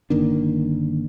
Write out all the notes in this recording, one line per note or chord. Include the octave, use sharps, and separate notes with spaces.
G1 D#3 A#3 D4